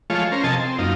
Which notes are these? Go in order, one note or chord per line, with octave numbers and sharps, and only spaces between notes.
F3 G#3 A3 F4 C#5
C#4 A#4 C5
C3 F3 A4 D#5 G#5 A5
C4
F#2 A#3 D#4 F4